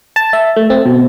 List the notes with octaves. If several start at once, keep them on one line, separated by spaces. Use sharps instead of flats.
A5
E5
A3
C4
B2